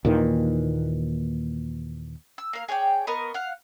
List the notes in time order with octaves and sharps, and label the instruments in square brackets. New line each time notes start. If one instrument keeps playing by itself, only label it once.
[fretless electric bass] D#2 A#2 D#3 E3
[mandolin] E6
A#3 F5
G#4 C#5 D5 G5
B3 A#4 D#5 C#6
F5 F#5